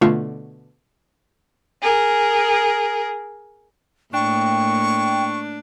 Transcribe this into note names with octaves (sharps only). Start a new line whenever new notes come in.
B2 D3 A3 F4 F5 C#6
G#4 A#4
A2 A#3 D4 G5 C#6